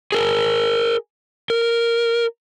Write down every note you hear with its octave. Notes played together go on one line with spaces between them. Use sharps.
G#4 A#4
A#4